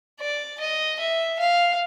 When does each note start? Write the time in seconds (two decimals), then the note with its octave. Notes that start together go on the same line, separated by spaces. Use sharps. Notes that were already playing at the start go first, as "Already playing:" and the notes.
0.20 D5
0.60 D#5
0.99 E5
1.39 F5